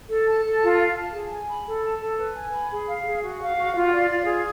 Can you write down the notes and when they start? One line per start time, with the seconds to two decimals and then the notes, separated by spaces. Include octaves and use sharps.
0.09 A4
0.26 A5
0.44 A4
0.61 F4
0.79 F5
0.96 A5
1.13 G#4
1.31 G#5
1.48 B5
1.66 A4
1.84 A5
2.01 A4
2.18 B4
2.36 G#5
2.52 B5
2.70 G#4
2.87 F5
3.05 G#4
3.23 F#4
3.40 F5
3.57 F#4
3.74 F4
3.92 D5
4.10 F4
4.27 G#4